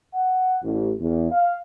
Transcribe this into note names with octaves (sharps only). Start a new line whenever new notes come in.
F#5
A1
E2
F5